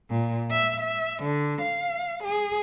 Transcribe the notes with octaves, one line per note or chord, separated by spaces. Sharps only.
A#2
E5
E5
D3
F5
G#4